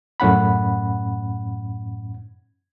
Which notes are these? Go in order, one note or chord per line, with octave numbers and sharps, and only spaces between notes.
F#2 A2 C#4 F#5 B5